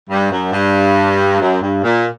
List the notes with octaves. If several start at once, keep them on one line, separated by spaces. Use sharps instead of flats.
G2
F#2
G2
F#2
G2
A#2